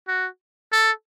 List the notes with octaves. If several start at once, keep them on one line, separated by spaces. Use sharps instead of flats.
F#4
A4